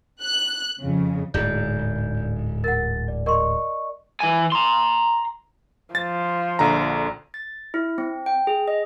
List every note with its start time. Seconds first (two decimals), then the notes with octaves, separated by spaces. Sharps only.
0.23 F#6
0.79 F2 C#3
1.34 D1 G#2 D5 G6
2.64 A#4 F#5 A6
3.08 D5
3.26 A#4 D5 D#5 C6 C#6
4.20 E3 G#5
4.52 A#5 C6
5.95 F3 A6
6.59 A#1 D3 A#5
7.34 A6
7.74 E4
7.98 C4
8.26 G5
8.47 G#4
8.68 D#5